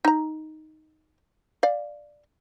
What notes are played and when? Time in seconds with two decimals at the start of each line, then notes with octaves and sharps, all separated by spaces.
0.05 D#4 A#5
1.63 D5 F5